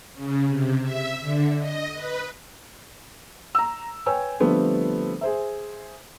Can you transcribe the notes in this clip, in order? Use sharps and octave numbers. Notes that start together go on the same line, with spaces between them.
C#3
C3
E5
D3
D#5
B4
A#5 E6
B4 C#5 G5 G#5 E6
D3 F3 G3 A3 B3 C4
G#4 C5 E5